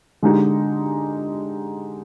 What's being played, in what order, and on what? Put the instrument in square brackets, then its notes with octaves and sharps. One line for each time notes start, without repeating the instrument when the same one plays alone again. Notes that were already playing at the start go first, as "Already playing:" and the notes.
[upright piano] D3 G#3 D#4 G4